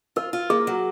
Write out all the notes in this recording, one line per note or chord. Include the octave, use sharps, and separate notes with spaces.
F4 A#4
F4
A#3 G#4
F#3